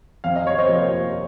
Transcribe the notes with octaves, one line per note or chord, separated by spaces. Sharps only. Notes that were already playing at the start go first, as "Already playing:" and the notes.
F2 F5
D#5
C#5
C5 D#5
C3 F3 A#3